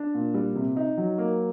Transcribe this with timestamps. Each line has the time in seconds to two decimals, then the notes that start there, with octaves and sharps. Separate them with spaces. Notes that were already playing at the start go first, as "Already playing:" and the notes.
Already playing: D4
0.14 A#2
0.34 G3
0.55 C3
0.77 D#4
0.98 F#3
1.18 A#3